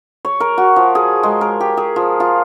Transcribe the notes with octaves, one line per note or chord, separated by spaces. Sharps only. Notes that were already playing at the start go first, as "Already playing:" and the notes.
C#5
A#4
F#4
F3
G#4
G#3
A#4
G4
G#4
F3
F4